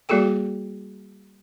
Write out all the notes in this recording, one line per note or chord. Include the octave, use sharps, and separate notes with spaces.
G3 A#3 F#4 G#4 A4 G5